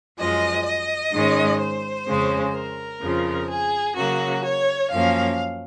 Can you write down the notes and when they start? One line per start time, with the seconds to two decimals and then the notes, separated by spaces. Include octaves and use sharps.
0.18 F#2 F3 G#3 D#5
0.65 D#5
1.12 G#2 D#3 G#3 C#4
1.60 C5
2.07 F2 C#3 G#3 C#4
2.54 A#4
3.01 F2 C#3 F3
3.49 G#4
3.96 C#3 F#3 A#3 F#4
4.43 C#5
4.90 F#2 F3 A#3 C#4 F5